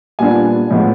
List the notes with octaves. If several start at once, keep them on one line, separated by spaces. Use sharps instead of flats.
A#2 G3 B3 D4 F4 G#5
A2 F3 G#3 B3